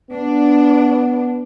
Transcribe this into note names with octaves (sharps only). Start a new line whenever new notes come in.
B3 D4